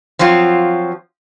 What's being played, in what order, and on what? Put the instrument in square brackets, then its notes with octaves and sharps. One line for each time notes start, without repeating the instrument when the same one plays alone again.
[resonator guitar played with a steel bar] F3 F#3 C4 F4